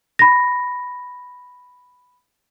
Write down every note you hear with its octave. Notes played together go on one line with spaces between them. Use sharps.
B5 A#6